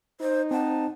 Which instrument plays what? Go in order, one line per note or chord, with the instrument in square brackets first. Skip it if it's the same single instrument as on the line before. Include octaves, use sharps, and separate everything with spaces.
[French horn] D#4 [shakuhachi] C5
[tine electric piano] C4 F#5 [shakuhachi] A5